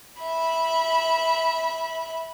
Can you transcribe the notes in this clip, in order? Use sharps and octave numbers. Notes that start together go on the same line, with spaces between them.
E5 B5